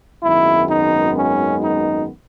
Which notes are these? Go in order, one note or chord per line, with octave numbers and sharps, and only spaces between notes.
G#1 F#2 D#3 G#3 B3 E4
D#4
C#4
D#4